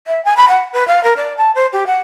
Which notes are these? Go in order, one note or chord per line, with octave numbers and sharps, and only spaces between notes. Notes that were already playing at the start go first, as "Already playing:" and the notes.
E5
G#5
B5
F#5
B4
F5
A#4
D5
A5
C5
G4
F#5